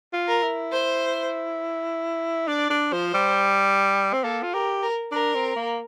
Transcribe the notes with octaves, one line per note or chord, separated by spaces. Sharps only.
F4
A#4
E4
C5
D4 D5
D4
F3 C5
G3
C4
A#3 A4
F4
G4 A#4
A#4
D4 A#4
C4
A#3